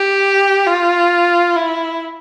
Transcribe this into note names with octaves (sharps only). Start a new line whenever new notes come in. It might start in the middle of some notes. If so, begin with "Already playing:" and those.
Already playing: G4
F4
E4